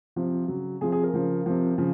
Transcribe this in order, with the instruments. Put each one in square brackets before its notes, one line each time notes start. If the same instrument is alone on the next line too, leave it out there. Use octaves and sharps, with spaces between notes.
[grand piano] C3 F3
C#3 F#3
C3 F3 G#4
G#4
A#4
C#3 F3
C3 F3
C#3 F3